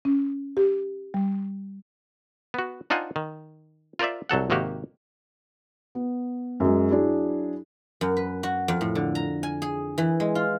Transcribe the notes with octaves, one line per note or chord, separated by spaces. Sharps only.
C#4
G4
G3
B3 F#4
D4 D#4 F4 C5 F#5 G#5
D#3
F4 A#4 C5 D5 E5
C2 F#3 A4 F#5
G#1 C3 D#3 A#3 F#4 G4
B3
F#2 G#3
F#3 D4 E4 G#4
F#2
B4
F#4
F2
A2
D3
A#5
G#5
G#4
E3
G#3
F4